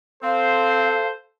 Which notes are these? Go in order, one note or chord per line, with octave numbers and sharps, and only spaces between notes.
C4 A4 C5 F5